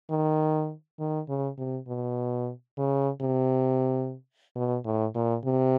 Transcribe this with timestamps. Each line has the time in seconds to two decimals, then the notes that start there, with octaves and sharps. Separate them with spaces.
0.10 D#3
0.99 D#3
1.29 C#3
1.58 C3
1.88 B2
2.78 C#3
3.21 C3
4.56 B2
4.85 A2
5.15 A#2
5.45 C3